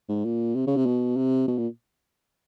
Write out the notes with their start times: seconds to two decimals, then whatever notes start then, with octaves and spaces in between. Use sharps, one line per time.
0.09 G#2
0.25 A#2
0.55 C3
0.67 C#3
0.76 C3
0.86 B2
1.17 C3
1.48 B2
1.58 A#2